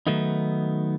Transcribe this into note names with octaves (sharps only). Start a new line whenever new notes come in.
D#3 F#3 A3 B3 D#4